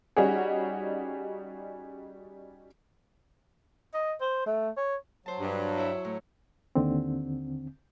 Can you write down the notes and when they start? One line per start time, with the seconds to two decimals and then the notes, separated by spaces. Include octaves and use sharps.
0.16 G3 C#4 D#4 F#4 G#4
3.94 D#5
4.21 C5
4.46 A3
4.77 C#5
5.26 F#3 C5 A5
5.39 G2
5.77 E4 C#5 E5
6.05 A2
6.75 D#2 D3 C4